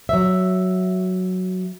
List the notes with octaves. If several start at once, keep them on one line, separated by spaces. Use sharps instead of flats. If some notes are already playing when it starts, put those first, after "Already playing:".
F#3 E5